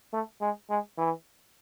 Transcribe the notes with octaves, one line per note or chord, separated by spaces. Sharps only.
A3
G#3
G#3
E3